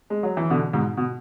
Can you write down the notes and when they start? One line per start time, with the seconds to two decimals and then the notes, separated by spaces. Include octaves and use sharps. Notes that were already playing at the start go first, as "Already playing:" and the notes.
0.10 G#3
0.23 F#3
0.37 E3
0.50 B2 D3
0.73 G#2 B2
0.97 B2